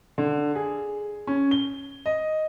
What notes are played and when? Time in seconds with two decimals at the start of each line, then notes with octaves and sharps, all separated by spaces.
0.18 D3
0.55 G#4
1.27 C#4
1.51 G7
2.06 D#5